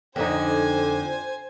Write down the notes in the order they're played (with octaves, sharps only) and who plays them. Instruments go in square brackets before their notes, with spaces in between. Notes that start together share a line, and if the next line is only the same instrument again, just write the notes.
[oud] F2 D3 D#4 [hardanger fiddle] C5 G#5